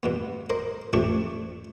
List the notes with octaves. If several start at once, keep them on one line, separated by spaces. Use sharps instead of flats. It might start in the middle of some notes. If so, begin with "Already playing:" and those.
G2 B2 B3
A#4 C5 D#5
A#1 F2 C3 A3 D4 C#6